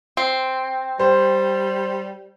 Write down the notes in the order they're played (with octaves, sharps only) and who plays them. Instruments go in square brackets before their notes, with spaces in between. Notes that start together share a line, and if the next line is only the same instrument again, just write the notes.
[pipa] C4
[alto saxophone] G3 [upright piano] C5